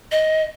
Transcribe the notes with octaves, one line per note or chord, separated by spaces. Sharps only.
D#5